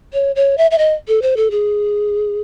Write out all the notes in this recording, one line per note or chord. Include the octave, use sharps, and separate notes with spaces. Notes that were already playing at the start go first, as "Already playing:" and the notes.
C#5
C#5
E5
E5
D#5
A4
C5
A4
G#4